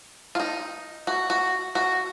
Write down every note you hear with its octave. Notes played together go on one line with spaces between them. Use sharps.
F4
D#4
F#4
F#4
F#4